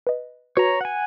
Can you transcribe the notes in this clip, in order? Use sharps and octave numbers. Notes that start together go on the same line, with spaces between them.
B4 D#5
F#4 B4 C#5 A#5
F#5 G#5